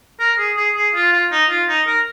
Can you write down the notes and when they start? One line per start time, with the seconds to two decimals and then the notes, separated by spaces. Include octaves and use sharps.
0.20 A#4
0.38 G#4
0.57 G#4
0.76 G#4
0.94 F4
1.12 F4
1.31 D#4
1.49 F4
1.68 D#4
1.86 A#4